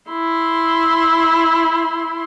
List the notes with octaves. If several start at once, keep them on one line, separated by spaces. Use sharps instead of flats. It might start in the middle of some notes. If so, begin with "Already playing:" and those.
E4 C6